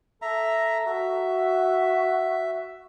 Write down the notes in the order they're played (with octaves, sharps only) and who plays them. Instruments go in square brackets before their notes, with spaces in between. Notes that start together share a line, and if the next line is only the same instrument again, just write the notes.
[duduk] A4 [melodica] E5 A#5
[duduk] F#4 [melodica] E5